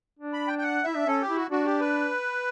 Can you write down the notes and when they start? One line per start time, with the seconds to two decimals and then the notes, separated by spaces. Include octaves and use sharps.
0.19 D4
0.33 B5
0.48 G5
0.59 G5
0.63 F#5
0.84 E4 E5
0.96 D4
1.07 C#4 A4
1.21 G4
1.28 E4
1.36 F#4
1.51 D4 F#4
1.65 G4
1.80 B4